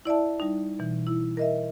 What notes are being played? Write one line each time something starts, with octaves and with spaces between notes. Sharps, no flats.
E4 D5 E5 A5
G3 D#4
B2 E3
E4
A#4 D#5 E5